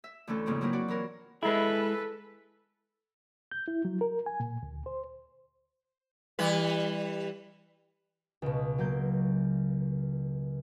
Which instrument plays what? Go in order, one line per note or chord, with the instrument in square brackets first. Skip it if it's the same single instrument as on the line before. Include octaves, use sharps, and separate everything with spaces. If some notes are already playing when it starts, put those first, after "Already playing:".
[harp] E5
D2 E3 A3 C#4 A4
F2 G#2 C#3 A#3 C4
F#3 A#3 C4 E4 A#4
F#4 D5
E3 F4 A#4 C#5
[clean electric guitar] G#3 E4 [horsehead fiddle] A4 B4
[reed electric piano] G6
E4
F#3
A#4
G#5
A#2
D2
C5
[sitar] E3 G3 B4
[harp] C#2 B2
F#3 A#3 G6